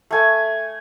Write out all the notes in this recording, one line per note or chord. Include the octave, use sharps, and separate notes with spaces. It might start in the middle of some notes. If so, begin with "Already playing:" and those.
A3 G#5